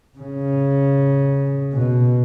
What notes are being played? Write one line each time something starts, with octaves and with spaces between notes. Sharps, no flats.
C#3
B2